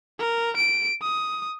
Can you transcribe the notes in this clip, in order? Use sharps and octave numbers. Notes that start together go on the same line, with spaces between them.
A#4
D7
D#6